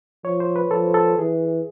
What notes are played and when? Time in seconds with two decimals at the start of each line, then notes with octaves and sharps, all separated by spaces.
0.24 F3 C#5
0.40 C5
0.56 B4
0.71 F3 A4
0.94 A4
1.19 E3 G#4